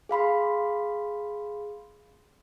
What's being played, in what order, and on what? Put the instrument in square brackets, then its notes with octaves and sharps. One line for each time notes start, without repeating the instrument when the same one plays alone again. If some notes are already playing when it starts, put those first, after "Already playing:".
[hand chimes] G#4 F5 B5 C6